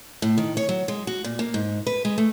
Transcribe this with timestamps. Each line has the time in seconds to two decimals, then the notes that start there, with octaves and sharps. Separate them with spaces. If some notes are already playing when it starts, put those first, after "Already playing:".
0.22 A2
0.38 D#3
0.57 C#5
0.69 F#3
0.88 G#3
1.07 F#4
1.24 A#2
1.39 A#3
1.54 G#2
1.87 B4
2.05 G#3
2.18 A3